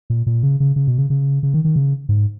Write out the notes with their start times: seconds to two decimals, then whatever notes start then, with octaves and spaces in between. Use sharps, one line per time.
0.10 A#2
0.27 A#2
0.43 C#3
0.60 C#3
0.76 C#3
0.87 B2
0.98 C#3
1.10 C#3
1.43 C#3
1.54 D#3
1.65 D#3
1.76 C#3
2.09 G#2